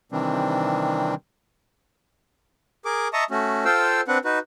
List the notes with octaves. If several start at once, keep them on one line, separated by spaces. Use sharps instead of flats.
C3 D#3 E3 G3 C4 D4
G#4 A#4 D6
D#5 E5 A5 A#5 C#6 D#6
A3 C#4 F#4
F4 A4 C5 F5 G5 E6
C4 D4 B4 F#5
D#4 F#4 B4